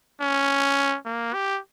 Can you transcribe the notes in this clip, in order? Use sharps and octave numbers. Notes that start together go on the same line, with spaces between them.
C#4
A#3
G4